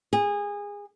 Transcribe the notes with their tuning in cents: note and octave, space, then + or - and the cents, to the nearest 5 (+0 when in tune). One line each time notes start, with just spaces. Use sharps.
G#4 -25